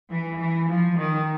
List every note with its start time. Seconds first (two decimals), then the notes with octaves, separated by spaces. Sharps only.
0.11 E3
0.39 E3
0.69 F3
0.98 D#3